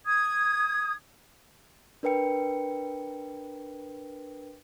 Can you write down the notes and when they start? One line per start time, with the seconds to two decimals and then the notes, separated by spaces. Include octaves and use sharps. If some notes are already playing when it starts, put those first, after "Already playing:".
0.05 D#6 G#6
2.03 D4 A#4 B4 G5 C#7